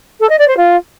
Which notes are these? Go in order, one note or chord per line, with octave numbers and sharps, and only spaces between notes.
A4
D#5
D5
C5
F4